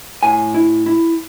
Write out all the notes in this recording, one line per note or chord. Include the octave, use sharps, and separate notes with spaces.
A2 G#5
E4
E4